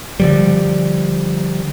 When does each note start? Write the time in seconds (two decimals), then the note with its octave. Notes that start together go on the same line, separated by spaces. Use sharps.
0.20 D3 F3 G3